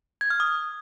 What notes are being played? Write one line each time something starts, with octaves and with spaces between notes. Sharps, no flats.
G#6
F6
D#6